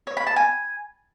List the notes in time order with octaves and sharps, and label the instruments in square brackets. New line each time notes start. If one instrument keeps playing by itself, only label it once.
[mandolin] C#5
B5
A5
G#5